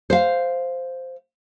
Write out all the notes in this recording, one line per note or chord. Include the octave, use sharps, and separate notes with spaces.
C5 F5